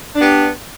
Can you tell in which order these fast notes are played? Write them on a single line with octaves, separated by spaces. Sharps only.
D4 B3 G4